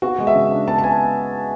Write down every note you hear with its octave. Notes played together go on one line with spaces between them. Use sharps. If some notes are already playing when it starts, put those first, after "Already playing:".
B3 F#4
G#3
E5
C#3
D4
B3 A5
A5
B3 G#5